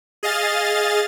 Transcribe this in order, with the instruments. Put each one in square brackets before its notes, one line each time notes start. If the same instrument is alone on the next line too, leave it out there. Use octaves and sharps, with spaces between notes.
[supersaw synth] G#4 D#5 F5 A6